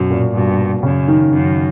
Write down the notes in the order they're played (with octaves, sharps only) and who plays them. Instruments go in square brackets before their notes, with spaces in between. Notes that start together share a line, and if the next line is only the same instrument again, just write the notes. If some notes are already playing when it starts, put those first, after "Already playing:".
Already playing: [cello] F#2 [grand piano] B2
[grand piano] A#2
[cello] G2 [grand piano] B2
[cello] F#2 [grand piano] C#3
[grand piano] D#3
[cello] F#2 [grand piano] D#3